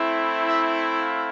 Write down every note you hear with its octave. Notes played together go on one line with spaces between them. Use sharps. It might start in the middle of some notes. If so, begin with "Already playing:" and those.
Already playing: A3 C4 E4
E5
F5